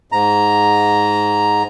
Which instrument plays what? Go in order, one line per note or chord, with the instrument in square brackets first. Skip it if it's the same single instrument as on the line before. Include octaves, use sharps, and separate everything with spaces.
[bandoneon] G#2 A#5